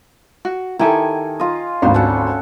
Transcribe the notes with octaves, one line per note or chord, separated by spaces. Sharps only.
F#4
D#3 E4 G4 A4 G#5
F4 D#5
G#1 D2 F#4 C5 F5
C#4 A4 F#5